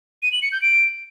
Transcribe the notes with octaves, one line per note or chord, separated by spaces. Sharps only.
D#7
F#7
C#7
G6
D7